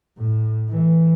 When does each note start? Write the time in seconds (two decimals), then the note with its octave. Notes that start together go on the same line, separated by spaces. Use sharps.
0.17 A2
0.69 E3